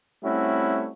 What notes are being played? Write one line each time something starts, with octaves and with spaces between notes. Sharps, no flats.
G3 A3 C4 C#4 E4 F#4